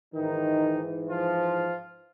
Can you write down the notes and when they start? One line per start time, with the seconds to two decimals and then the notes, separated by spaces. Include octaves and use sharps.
0.14 G#2 D#3 E3 D#4
1.09 F3 F4